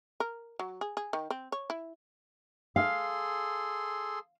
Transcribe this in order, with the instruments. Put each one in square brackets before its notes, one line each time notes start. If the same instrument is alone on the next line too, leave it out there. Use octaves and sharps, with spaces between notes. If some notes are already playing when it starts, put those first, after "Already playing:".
[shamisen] A#4
F#3
G#4
G#4
D#3
C4
C#5
E4
[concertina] G#4 A4 C6 [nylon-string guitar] F5